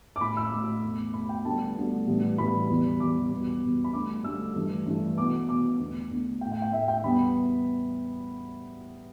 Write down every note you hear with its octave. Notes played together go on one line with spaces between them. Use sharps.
D6
A2 A3 B5
E6
A2 A3 D6
E2 B2 A3
E2 B2 A3 B5
G5
D2 D3 G3 B3 A5
D2 D3 G3 B3
A2 E3 G3 B3
A2 E3 G3 B3 B5
E2 E3 G3
E2 E3 G3 D6
E2 B2 G3 B3
E2 B2 G3 B3
B5
D2 D3 G3 D6
D2 D3 G3 E6
G2 E3 A3
G2 E3 A3
B2 B3 D6
B2 B3 D6
E2 D3 A3
E2 D3 A3
A2 A3 G5
G5
G5
A2 A3 E5
G5
E2 D3 G3 B3 B5